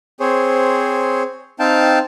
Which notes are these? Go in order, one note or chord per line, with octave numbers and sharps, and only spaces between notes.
C4 G#4 C5 C#5
C4 D#4 F5 G5 A5